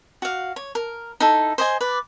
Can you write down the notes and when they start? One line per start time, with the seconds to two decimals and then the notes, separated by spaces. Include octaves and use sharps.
0.22 F#4 F5
0.56 C#5
0.75 A#4
1.20 D#4 E4 A4
1.58 C5 D#5 G#5
1.81 B4 D5